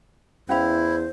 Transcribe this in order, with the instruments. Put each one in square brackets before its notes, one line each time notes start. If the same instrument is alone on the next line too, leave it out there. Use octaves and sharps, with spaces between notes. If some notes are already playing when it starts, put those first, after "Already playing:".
[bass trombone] E2 [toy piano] C#4 F5 B5 [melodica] E4 [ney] C5